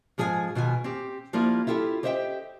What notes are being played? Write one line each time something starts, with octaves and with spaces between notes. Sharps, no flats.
G#2 F3 G#4 A4 G#5
B2 D#3 F4 G#5
C4 G4
F3 G3 A#3 E4 F4
E4 F4 G4 A4 E5
G4 C5 D#5 E5 F#5 G5